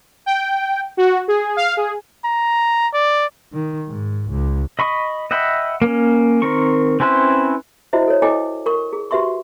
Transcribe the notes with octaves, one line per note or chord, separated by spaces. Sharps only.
G5
F#4
G#4
F5
G#4
A#5
D5
D#3
G#2
C#2
D#5 B5 C#6 D#6
D#5 E5 F#5 G5 B5
A#3 C#4
D#3 C4 A#4 C#6
C4 C#4 E4 B4 C5
E4 F#4 C5 D#5 E5
A4 C#5
E4 A4 D#5 G5 G#5 D6
A#4 C#6
G#4
F#4 G4 B4 E5 C6 C#6